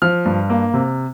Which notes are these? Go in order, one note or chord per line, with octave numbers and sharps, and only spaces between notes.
F3 F6
G2
A#3
C3